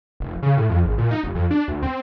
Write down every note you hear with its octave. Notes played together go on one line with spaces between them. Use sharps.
F1
C#3
A2
F2
G#1
A#2
D#4
F1
F2
D4
D2
C4